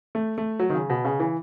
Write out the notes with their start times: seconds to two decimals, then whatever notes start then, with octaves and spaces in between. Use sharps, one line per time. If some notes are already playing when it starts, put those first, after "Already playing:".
0.15 A3
0.38 A3
0.59 F#3
0.70 D#3
0.75 C#3
0.90 B2
1.05 C#3
1.20 E3